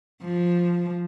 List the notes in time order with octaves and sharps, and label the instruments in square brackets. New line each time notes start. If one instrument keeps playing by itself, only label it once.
[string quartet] F3